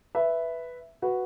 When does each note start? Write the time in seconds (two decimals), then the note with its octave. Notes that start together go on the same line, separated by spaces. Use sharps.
0.15 B4 E5
1.02 F#4 B4